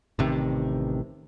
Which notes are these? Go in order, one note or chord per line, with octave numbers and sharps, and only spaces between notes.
A1 C3 D#3